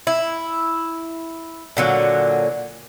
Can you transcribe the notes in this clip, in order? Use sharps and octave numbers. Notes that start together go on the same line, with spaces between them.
E4
A#2 D3 F#3